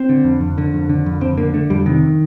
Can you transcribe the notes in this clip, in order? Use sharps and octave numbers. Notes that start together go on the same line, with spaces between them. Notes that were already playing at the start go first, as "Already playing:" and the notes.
Already playing: C4
D3
F2
F2
D3
F2
D3
F2
F2 C4
D3 A#3
D3 A3
F2 G3
C3 D#3